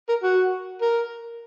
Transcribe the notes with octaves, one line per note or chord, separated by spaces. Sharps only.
A#4
F#4
A#4